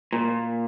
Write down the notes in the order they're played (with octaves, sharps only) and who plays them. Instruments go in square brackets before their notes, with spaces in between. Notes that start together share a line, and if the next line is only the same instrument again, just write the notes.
[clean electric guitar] A#2